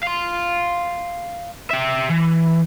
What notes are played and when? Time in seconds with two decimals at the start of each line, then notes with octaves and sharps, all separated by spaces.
0.03 F5 C6
1.71 G4 E5
2.09 E3